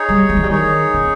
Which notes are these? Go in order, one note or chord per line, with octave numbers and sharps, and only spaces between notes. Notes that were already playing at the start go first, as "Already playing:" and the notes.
Already playing: D#4 G#4 C#5
G3
G3
E3
G3
D#3 D#4 G#4 C#5
C#3